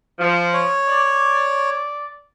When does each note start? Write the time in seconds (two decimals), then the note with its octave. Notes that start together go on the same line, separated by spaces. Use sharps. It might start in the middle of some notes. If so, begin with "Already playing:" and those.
0.20 F3
0.53 C#5
0.88 D5